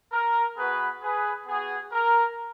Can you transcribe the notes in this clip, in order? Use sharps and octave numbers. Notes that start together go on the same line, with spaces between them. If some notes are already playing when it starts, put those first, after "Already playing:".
A#4
B3 F#4 G#4 B4
G#4 B4
B3 F#4 G#4
A#4